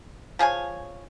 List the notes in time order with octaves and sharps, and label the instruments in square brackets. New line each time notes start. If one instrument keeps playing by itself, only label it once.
[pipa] F3 G#4 C#5 G#5